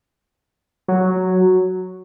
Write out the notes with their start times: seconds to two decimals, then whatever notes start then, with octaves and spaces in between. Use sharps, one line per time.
0.88 F#3